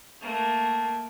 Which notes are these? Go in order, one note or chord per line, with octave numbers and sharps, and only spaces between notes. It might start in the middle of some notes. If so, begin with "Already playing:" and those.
A3 A#3